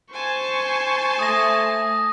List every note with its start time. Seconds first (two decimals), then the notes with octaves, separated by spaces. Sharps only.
0.13 C5 G#5 A5 C#6
1.19 A3 D#6 A#6